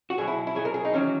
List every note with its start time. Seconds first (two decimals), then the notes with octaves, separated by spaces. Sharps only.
0.10 F#4
0.18 B2 F#3 G#4
0.28 E4
0.47 E4
0.55 B2 F#3 G#4
0.65 A#4
0.74 G#4
0.85 D#4
0.93 E2 D#3 F#3 C#4